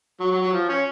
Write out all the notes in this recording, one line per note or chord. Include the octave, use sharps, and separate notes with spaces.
F#3
F#3
F#3
F3
C#4